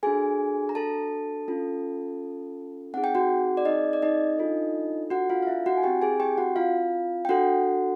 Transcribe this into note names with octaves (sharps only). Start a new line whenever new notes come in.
D4 F#4 G#4 A4 G#5
A#5
A4 A5
C#4 F4 A4
C4 D#4 G#4 F#5
G5
F#4 F#5
D5
D#4 D#5
D5
D#4 D#5
D4 F4 A4
F#4 F#5
F4 F5
F5
E4 E5
F#4 F#5
G#5
C4 E4 G4 G5
G#4 G#5
G4 G5
F#4 F#5
F4 F5
G5
D4 F#4 A4 F#5